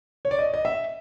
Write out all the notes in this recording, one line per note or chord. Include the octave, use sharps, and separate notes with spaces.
C#5
D5
D#5
D#5
E5